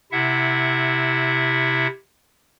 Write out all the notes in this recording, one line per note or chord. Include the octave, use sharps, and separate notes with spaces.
C3 E4 E5 F#5